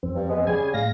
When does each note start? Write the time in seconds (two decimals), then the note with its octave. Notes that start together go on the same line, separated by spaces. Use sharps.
0.03 F2 C4
0.15 G2
0.29 G#3 B3
0.47 C#3 G3 G#4 G#5
0.74 A2 F5 A#6